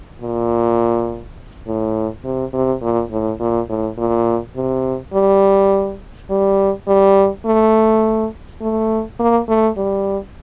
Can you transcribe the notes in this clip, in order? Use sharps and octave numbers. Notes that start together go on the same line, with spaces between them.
A#2
A2
C3
C3
A#2
A2
A#2
A2
A#2
C3
G3
G3
G3
A3
A3
A#3
A3
G3